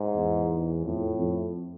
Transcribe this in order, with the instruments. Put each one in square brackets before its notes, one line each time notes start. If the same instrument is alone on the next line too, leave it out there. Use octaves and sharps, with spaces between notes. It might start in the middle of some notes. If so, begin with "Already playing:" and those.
Already playing: [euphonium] G#2
[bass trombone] E2
[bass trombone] F2 [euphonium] A2
[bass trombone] F2